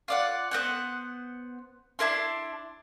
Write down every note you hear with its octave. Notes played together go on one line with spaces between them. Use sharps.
F4 D5 F#5
B3 C4 C5 F#5
D4 E4 A#4 C6